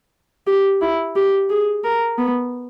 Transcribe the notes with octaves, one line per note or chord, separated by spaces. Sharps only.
G4
E4
G4
G#4
A#4
B3